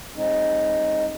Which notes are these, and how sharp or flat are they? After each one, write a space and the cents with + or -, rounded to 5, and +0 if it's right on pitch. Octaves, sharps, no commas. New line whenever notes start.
G#3 +0 C4 +40 D#4 +0